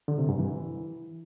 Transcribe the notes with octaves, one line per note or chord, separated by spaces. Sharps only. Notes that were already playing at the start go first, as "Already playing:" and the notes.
D3
C3
G2
E3